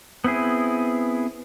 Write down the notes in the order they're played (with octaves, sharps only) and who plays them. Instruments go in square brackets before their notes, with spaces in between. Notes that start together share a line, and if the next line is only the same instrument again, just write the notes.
[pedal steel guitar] B3 C4 E4 G#4